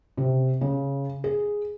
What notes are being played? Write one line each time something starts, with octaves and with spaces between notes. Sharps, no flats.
C3
C#3
G#4